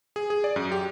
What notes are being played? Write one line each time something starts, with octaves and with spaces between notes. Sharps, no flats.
G#4
G#4
D5
F#2
G4